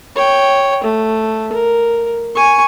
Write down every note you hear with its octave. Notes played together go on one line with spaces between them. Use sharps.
C#5 G5
A3
A#4
G#5 C#6